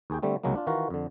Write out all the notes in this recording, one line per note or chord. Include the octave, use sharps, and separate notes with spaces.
D#2 G#4 G5
D3 G3 A3 C4
C2 C#3 F#3 G#3 A#3
D4 F4
D#3 E3 F4 F#4 A#4
F2 D3